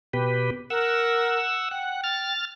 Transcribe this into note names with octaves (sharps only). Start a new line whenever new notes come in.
B2 G4 B4
A#4 F#5 E6
F#5 G5
F6 A6